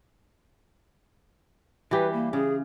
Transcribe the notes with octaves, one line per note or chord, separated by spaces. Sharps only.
E3 G3 G4 B4
A#3
C#3 G#4